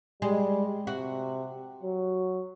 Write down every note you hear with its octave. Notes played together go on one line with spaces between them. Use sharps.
G3 G#3
C3 F#4
F#3